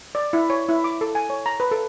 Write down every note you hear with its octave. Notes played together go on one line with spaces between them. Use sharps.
D5
E4
C#5
E4
D6
A4
G#5
C#5
A#5
B4
A4